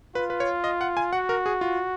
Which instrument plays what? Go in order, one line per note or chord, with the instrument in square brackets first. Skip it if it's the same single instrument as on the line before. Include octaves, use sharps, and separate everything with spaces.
[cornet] F4 [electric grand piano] B4
[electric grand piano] B4
C#5
D#5
F#5
G#5
[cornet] F#4 [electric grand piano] F#5
[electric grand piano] A#4
G#4
F4